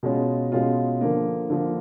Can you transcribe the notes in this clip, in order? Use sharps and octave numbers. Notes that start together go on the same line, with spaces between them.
B2 G#3 C#4 F4
B2 G#3 C#4 F4
D3 F3 A#3
D3 F3 A#3